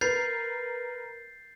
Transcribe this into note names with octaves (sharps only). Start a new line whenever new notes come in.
A#4 B4 G6 A6 C7 F7